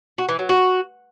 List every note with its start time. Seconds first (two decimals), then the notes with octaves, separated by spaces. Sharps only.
0.18 F#4
0.29 E3
0.39 F#3
0.49 F#4